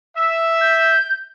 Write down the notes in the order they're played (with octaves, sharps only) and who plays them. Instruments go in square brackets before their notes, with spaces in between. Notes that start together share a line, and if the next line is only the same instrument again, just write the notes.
[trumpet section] E5
[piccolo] G6